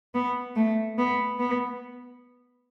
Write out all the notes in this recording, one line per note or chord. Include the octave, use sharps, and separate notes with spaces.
B3
A3
B3
B3